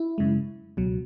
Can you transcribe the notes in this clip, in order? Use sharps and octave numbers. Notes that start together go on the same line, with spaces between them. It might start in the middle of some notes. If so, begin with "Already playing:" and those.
Already playing: E4
F#2 C#3 G#3
C#2 B2 F#3